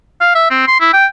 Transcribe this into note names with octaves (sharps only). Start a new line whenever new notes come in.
F5
E5
C4
C6
E4
G5